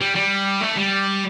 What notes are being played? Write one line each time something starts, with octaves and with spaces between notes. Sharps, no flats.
G3
G3
A3
G3